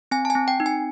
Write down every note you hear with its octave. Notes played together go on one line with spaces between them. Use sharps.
C4 G#5
A5
G#5
C4
G5
D#4
G#5